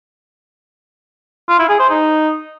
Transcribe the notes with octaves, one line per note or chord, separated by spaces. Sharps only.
F4
E4
G#4
C5
D#4